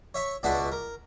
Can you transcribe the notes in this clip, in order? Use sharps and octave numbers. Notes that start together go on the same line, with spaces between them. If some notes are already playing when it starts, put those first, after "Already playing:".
C#5 E5 C#6
C#2 B2 D4 F#4 E5 A5
A#4